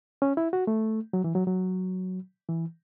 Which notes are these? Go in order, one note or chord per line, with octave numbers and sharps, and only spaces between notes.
C#4
E4
F#4
A3
F#3
E3
F#3
F#3
E3